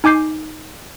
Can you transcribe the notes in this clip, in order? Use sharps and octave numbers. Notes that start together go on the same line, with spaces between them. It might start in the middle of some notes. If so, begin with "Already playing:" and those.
D#4 G#5 D6 G6 C7